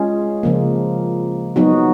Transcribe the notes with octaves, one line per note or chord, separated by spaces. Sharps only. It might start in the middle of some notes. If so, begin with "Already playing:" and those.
Already playing: G#3 C#4 F4 G#4
C#3 F3 A#3
F#3 B3 D#4 F#4